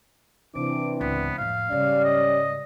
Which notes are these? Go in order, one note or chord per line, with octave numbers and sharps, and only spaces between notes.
C3 E3 C4 D4 D6
C#2 G#2 B3
F2 A2 F5
G#2 C#3 G3 C#4 D5
D#5